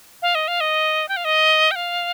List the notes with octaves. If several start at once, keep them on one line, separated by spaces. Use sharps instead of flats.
F5
D#5
F5
D#5
G5
F5
D#5
G5
F5